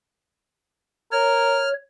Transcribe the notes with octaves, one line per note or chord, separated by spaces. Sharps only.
A#4 C#5 F6